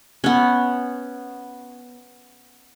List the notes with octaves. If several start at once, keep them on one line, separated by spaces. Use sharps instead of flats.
B3 C#4